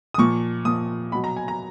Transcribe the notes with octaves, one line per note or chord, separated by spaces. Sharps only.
D#6
A#2 F3 C#6
A#2 F3 D#6
B2 F#3 B5
A#5
G#5
A#5